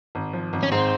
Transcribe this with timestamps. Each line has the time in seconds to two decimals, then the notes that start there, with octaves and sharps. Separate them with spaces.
0.15 G#1
0.33 F3
0.53 G#1
0.63 C#4
0.72 G#2 C4